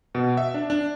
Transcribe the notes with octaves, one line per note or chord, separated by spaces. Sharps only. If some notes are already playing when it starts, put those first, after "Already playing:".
B2
E5
D4
D4